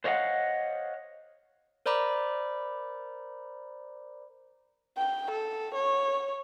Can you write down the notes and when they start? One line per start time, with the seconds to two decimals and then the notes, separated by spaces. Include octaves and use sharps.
0.04 C5 C#5 D#5 F5 F#5
1.86 A#4 C5 D5 A#5 B5 D6
4.97 G5
5.31 A4
5.75 C#5